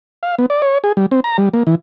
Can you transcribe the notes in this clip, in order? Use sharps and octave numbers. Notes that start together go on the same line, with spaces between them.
F5
B3
D5
C#5
G#4
G3
C4
A#5
G3
A#3
E3